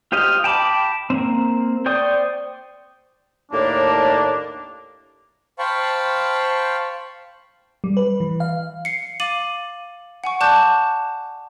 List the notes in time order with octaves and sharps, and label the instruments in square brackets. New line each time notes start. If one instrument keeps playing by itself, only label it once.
[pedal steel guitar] F4 G4 C5 D#5 F5
G5 A5 B5 D6
A#3 C4
C5 D5 G5 C#6 D#6
[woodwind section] D#2 A2 A#3 D4
[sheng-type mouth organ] C5 F5 G5 A5 B5 C#6
[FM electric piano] G3
B4
E3
F5
[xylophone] C7 C#7
F5 D6 A6 D#7 F#7
F#5 G#5 C#6
D5 A5 D6 F#6 G6 E7